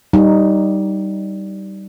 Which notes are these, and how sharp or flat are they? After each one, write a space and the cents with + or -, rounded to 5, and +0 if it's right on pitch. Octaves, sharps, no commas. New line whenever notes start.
G3 -15 D#4 +0